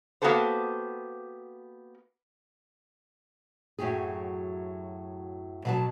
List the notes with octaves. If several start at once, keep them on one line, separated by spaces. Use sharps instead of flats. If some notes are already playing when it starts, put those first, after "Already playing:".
A#3 B3 F#4 G4 A4 C5
F#2 A2 F#3 G4 G#4
B2 F#3 A5